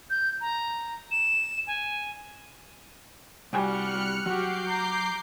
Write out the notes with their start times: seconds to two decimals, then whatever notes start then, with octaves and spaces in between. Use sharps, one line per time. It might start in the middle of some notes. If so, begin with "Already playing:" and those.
0.10 G6
0.41 A#5
1.11 E7
1.67 G#5
3.53 C2 G3 F#4 G5 G#5 F6 F#6 C#7
4.26 F#3 F#4 G4 D6 G6 C7
4.69 A#5